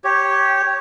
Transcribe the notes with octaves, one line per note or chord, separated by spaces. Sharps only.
G4 C#5